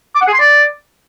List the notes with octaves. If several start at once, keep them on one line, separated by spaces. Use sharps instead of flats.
D6
F#5
G#4
C6
D5